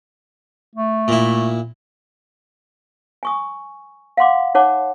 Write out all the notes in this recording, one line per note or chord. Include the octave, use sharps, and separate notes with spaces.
A3
A#2 E4
G#5 C#6 D#6
F5 F#5 C6 D6
D#4 C#5 F#5 A5 D6